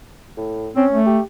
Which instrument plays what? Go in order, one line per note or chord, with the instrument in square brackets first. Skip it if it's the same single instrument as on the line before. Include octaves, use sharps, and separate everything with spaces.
[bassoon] A2
[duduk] C4 [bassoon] C#4
[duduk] A3
[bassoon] G4